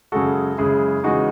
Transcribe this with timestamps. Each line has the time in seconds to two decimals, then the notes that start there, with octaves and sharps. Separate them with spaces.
0.12 F#2 C#3 G#3 F#4 A4
0.58 F#2 C#3 G#3 E4 G#4
1.04 E2 C#3 G#3 D#4 F#4